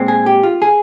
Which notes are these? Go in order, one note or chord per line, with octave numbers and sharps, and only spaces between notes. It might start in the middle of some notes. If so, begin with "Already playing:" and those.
Already playing: A#2 G#3 C4
G#4
G4
F4
G#4